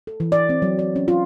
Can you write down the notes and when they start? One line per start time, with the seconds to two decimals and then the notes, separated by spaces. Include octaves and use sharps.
0.07 A4
0.20 E3
0.32 D5
0.49 C4
0.62 F#3
0.79 D5
0.96 C#4
1.08 F4